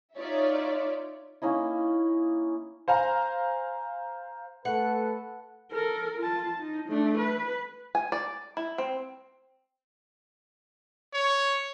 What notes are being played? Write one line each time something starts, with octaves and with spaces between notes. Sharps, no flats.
D#4 F4 C#5 D5 E5
A#3 C#4 D#4 E4
C5 F5 G#5 A#5
A3 A4 B4 F#5
A4 A#4
F4 A5
D#4
A3 D4
B4
G#5
D5
E4
C4
C#5